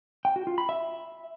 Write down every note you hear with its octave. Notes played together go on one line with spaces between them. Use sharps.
G5
F#4
F4
B5
E5